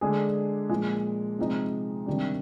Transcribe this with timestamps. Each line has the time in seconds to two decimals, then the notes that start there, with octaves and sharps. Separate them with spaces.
0.01 D3 G#3 D4 G#4
0.69 A#2 F3 G#3
1.39 C3 F3 G#3 D#4
2.06 C3 D#3 G3 D4